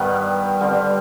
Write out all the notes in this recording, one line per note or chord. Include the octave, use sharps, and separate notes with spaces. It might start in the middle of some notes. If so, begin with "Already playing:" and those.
Already playing: G2 D#3 G3 B3
D3 G3 C4